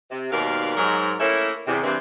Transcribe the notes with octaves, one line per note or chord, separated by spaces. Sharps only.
C3
D#2 G#2 B2 A#4 D5 F5
G#2 F#3 A#4
A3 A#3 C#4 E4
E2 C3
G2 C3 E3 A#3 C4